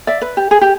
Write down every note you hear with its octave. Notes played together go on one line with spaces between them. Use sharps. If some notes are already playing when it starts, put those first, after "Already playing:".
D5 E5
B4
G4
G#4
G4